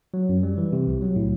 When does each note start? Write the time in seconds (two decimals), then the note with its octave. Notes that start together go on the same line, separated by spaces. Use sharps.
0.14 F#3
0.29 F#2
0.43 G3
0.58 E3
0.73 C3
0.87 C2
1.02 F#3
1.16 A2